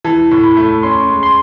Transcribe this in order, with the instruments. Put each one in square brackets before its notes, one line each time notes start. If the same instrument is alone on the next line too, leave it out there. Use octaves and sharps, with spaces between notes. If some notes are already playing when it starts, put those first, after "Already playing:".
[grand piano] E3 [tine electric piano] A5
[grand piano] A2
[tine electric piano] B5
[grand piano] A3
[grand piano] C#4 [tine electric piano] C6
[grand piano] G#3
[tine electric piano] C6